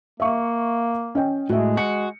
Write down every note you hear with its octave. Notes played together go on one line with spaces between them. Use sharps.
A#3 E5 F5 C#6
C#4 D#5 G5
A2 G#3 F#4 E5
F#4 C#7